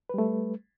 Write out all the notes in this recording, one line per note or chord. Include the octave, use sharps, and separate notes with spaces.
G3 A3 B4